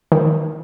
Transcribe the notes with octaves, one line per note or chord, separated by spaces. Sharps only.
D#3